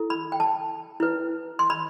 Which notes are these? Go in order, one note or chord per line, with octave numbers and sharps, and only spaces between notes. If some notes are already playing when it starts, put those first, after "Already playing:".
Already playing: E4 A4
B5
G5
A5
E4 B4
C6
B5